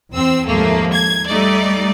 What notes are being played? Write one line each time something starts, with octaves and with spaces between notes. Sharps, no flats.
E2 C4 E6
D#2 G#2 F3 A3 A#3
G#6
G3 A3 D#4 D5